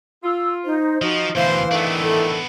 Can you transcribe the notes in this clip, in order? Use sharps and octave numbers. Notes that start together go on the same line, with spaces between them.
F4 E6
D#4 C5
F3 D#4 F#4 D#5
D2 B2 E3 C5 F5
D3 D#3 A3 B3 D4
A4